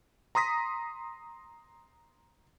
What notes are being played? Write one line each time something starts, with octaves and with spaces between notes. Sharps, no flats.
A#5 C6 D#6 A#6 B6